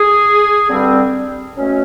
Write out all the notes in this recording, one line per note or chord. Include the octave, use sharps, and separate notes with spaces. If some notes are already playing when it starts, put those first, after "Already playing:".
Already playing: G#4
G2 D3 G3 C4
B2 F#3 A3 C#4